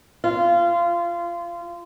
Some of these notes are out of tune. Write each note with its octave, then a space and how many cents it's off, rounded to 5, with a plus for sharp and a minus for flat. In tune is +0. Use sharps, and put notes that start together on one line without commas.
F4 -25